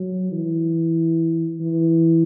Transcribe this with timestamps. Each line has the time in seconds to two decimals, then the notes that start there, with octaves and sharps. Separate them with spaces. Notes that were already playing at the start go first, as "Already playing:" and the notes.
Already playing: F#3
0.32 E3
1.60 E3